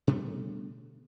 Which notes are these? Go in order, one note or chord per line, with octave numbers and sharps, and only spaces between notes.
B2 D3 G3 A3